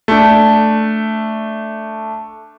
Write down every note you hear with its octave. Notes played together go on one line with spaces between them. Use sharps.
A3 D4